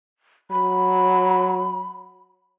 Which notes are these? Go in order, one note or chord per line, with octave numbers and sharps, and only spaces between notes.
F#3 B5